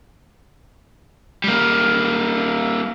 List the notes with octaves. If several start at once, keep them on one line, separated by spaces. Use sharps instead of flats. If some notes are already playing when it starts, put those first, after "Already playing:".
G3 A#3